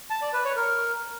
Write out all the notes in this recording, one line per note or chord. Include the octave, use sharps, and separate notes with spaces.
A5
D5
B4
C#5
A#4